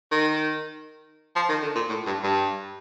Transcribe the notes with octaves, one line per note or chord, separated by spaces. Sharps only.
D#3
F3
D#3
D3
A#2
A2
G2
G2